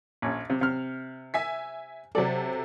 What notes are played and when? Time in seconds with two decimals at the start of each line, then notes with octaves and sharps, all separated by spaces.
0.22 A#1 C#4
0.50 C3
0.61 C3 F6
1.34 E5 G#5 B6
2.15 C3 F#3 A4 D5